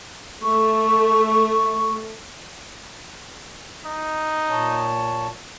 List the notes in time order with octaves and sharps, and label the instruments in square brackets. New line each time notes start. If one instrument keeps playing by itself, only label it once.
[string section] A3 [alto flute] C#6
[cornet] D#4
[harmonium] A#2 C#5 A5